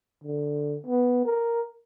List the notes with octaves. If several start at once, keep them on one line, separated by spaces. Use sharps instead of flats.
D3
B3
A#4